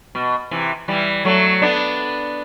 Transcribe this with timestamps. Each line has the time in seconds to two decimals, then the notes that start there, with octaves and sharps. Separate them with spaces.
0.15 B2
0.51 C3 E3
0.88 E3 G3
1.25 F#3 A3
1.62 B3 D4